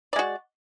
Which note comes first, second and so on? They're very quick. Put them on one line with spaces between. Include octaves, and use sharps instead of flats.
D5 G#3 F#4